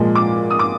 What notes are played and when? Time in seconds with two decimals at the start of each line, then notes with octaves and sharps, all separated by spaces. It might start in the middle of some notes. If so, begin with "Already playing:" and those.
Already playing: A#2 F3 G#3
0.15 D6
0.50 D#6
0.59 D6